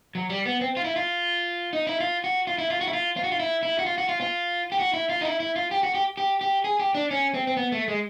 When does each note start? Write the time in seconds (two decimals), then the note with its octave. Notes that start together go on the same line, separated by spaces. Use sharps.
0.15 F#3
0.30 G3
0.46 B3
0.61 C4
0.77 F4
0.84 E4
0.96 F4
1.73 D#4
1.87 E4
2.00 F4
2.24 F#4
2.47 F4
2.58 E4
2.70 F4
2.81 F#4
2.88 E4
2.93 F4
3.17 F4
3.24 F#4
3.32 F4
3.40 E4
3.63 E4
3.79 F#4
3.86 F4
3.98 F#4
4.09 F4
4.21 F4
4.72 G4
4.79 F#4
4.93 E4
5.09 F4
5.21 D#4
5.25 E4
5.40 E4
5.56 F4
5.71 G4
5.83 F#4
5.94 G4
6.17 G4
6.41 G4
6.64 G#4
6.80 G4
6.95 D4
7.11 C#4
7.34 C4
7.47 C4
7.57 B3
7.72 A3
7.88 G#3